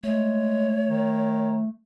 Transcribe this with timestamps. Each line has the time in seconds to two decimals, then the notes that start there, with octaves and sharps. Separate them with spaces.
0.04 G#3 A3 C#5
0.89 D#3